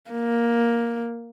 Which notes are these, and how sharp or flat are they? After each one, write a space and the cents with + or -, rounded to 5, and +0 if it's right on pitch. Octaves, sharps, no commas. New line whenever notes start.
A#3 +5